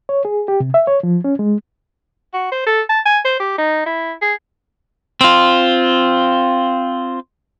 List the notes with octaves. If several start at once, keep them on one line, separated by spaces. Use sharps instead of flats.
C#5
G#4
G4
C3
E5
C#5
F3
C#4
G#3
F#4
C5
A4
A5
G#5
C5
G4
D#4
E4
G#4
C4 F4